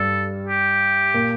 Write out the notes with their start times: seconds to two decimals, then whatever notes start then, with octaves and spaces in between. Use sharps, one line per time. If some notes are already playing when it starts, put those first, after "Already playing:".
Already playing: G2 G3 A4
0.47 G4
1.14 A#2 A#3